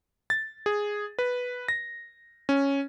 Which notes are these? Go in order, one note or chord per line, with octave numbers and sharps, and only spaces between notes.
A6
G#4
B4
A#6
C#4